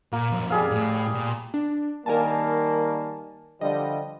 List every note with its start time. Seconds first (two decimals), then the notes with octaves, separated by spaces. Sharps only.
0.12 A#2 A#3
0.32 F2 F#3
0.50 G3 G#4 F5
0.71 A2
1.14 A#2
1.54 D4
2.06 D#3 G3 A#3 A#4 G#5 A5
3.61 D3 F3 G3 D#5